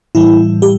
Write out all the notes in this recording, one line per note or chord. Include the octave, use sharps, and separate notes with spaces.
A2 E3 G3 E4
G4